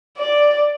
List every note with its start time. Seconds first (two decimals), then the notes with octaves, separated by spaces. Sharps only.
0.18 D5